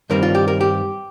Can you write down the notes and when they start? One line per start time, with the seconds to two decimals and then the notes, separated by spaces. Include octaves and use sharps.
0.10 G2 D#3 G3 C4 A#4
0.23 F4
0.35 G4
0.48 A#4
0.61 G4